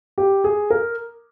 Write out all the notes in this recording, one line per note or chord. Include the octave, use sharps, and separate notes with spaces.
G4
G#4
A#4